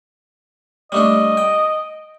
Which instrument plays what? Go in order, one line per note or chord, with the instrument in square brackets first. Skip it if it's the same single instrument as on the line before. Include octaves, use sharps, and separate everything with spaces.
[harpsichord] G3 A3 D4 [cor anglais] D#5
[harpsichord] G5